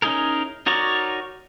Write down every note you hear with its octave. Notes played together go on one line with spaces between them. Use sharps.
C#4 D#4 E4 G#4 A#4
D#4 F#4 A#4 C#5 D5